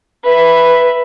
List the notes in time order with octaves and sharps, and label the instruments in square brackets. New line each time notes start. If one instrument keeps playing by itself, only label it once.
[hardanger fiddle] B4 E5